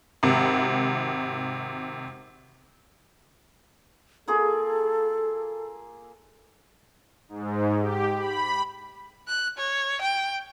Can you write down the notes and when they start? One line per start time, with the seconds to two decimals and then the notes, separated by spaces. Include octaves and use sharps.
0.23 G#1 C3
4.28 A#3 F4 G#4 A4
7.29 G#2
7.81 G4
8.17 B5
9.28 F#6
9.58 C#5
10.01 G5